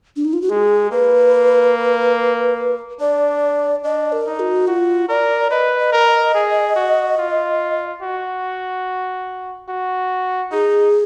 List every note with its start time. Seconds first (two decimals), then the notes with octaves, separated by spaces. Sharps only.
0.16 D4
0.25 D#4
0.33 F4
0.42 F#4
0.50 G#3 G#4
0.91 A#3 B4
3.00 D4 D5
3.84 D4 D#5
4.12 A#4
4.26 D#4
4.40 F#4
4.67 F4 F#4
5.09 A#4 D5
5.51 B4 D#5
5.79 D#5
5.92 A#4
6.07 D#5
6.34 G#4
6.76 F#4
7.18 F4
8.02 F#4
9.69 F#4
10.52 D#4 G#4